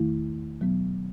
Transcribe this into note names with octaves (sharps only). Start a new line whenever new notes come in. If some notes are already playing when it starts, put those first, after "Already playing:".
Already playing: E2 D#3 A3 E4
B2 F#3 B3